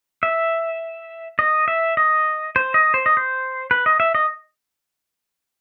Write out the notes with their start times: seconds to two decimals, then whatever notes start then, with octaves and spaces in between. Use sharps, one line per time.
0.23 E5
1.39 D#5
1.68 E5
1.97 D#5
2.56 C5
2.74 D#5
2.94 C5
3.06 D#5
3.17 C5
3.71 B4
3.86 D#5
4.00 E5
4.15 D#5